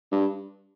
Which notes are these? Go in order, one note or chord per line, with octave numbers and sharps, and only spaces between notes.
G2